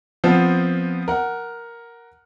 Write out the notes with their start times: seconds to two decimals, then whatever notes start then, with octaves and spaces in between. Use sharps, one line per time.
0.24 F3 B3 C4
1.08 A#4 F#5